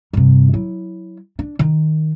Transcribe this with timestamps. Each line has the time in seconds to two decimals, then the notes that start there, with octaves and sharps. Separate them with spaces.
0.13 G2 C3
0.54 F#3 E4
1.39 D4
1.59 D#3